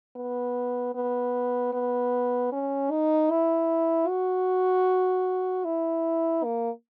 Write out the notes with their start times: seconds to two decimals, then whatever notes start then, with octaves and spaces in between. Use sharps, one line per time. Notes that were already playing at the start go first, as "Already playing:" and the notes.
0.17 B3
0.95 B3
1.73 B3
2.52 C#4
2.91 D#4
3.31 E4
4.08 F#4
5.65 E4
6.44 A#3